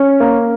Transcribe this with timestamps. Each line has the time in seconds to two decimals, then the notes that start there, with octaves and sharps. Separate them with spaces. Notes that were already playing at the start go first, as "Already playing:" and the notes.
Already playing: C#4
0.20 A#3